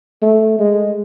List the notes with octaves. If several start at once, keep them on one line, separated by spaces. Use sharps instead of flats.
A3
G#3